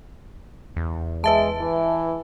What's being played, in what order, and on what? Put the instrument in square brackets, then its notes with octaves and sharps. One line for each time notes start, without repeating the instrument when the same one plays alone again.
[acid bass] E2
[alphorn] G#3 [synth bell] B4 E5 A5
[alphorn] E3